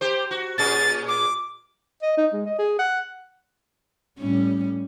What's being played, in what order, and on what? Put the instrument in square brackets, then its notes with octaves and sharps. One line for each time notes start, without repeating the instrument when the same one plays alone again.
[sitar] G4 C5
F#4
[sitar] A#2 C#4 G#4 [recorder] A6
[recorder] D6
[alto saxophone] D#5
D#4
G#3
D#5
G#4
F#5
[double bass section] A2 G3 [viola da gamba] C#4